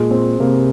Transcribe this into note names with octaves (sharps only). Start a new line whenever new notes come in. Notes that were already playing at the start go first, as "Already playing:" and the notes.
Already playing: A#2 G#3
C4
C3 A#3